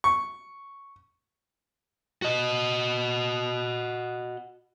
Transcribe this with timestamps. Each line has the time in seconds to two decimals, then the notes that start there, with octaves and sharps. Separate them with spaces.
0.04 C#6
2.22 F#4 D#5